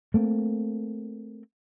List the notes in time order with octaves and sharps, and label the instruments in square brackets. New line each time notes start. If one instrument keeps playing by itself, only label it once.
[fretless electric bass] A3 A#3 C4